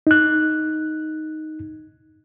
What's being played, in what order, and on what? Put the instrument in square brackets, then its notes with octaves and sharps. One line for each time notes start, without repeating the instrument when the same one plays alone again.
[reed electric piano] D#4 F#6